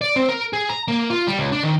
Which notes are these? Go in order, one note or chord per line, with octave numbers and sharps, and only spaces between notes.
D5
C4
A#4
G#4
A#5
A#3
F4
G3
C#2
D4
D#3